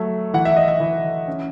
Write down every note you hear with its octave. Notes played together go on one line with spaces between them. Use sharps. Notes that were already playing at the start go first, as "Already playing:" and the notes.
Already playing: F#3 A3
E3 F#5
E5
D#5
E5
E3
C#4